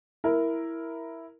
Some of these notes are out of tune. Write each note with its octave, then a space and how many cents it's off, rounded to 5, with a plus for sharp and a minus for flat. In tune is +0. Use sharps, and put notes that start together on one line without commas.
E4 +0 A#4 +0